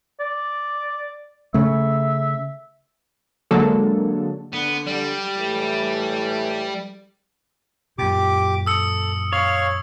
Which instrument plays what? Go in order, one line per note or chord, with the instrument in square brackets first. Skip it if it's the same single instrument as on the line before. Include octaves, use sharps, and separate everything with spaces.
[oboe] D5
[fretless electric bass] C#3 A3 [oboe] E5
[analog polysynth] D3 F#3 G#3 A#3 A4
[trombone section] D3 [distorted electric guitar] B3
[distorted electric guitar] G3
[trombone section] A2 E3 A3
[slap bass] F#2 A#2 [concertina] G4 D6
[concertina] A4 [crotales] D#6 E6 C#7
[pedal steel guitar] C#5 [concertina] F5 F6